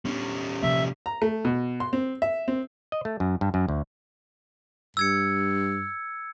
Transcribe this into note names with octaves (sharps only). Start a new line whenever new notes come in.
G3 B3 C#4 D4
C3 F3 A#3 E5
A#5
A3
B2
C6
C4
E5
C4
D#5
A3
F#2
G2
F#2
D2
G2 E6 G#6 C#7